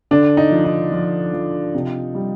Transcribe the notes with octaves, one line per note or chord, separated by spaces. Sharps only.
D3 D4
D#4
F3
D#4
F3
F3
C3
G3